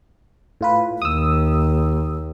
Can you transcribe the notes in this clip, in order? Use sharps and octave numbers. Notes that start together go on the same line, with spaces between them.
A2 F4 B4
D#2 D#6 E6